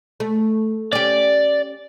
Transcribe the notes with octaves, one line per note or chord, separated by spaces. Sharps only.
A3
C#4 G4 D5